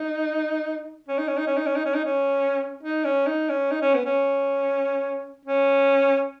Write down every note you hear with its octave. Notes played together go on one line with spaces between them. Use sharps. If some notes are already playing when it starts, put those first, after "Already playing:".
Already playing: D#4
C#4
D#4
C#4
D#4
C#4
D#4
C#4
D#4
C#4
D#4
C#4
D#4
C#4
D#4
C#4
D#4
C#4
B3
C#4
C#4